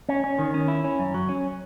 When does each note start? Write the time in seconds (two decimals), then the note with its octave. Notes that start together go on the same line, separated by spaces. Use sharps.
0.09 C#4
0.24 C#4
0.39 D#3
0.54 C#4
0.68 E4
0.84 C#4
0.99 F#2
1.14 F#3
1.29 C#4